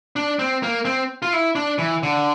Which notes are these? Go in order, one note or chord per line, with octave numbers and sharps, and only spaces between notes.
D4
C4
A#3
C4
F4
E4
D4
E3
D3